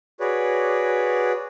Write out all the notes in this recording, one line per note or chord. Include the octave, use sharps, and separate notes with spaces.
F#4 G#4 B4 C#5 D5